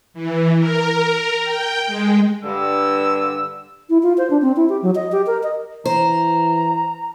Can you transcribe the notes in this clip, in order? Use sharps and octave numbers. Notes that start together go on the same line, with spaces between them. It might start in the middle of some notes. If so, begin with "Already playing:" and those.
E3
A#4
G5
G#3
G2 D3 E6
E4
F4
C5
D4
C4
E4
G4
F#3
D#5
G4
A#4
D#5
E3 C5 A#5